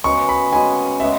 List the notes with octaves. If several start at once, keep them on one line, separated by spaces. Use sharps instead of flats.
C#3 G#3 B3 F#4 C#6
B5
C#3 G#3 B3 F#4 G#5
C#3 G#3 B3 F#4 E5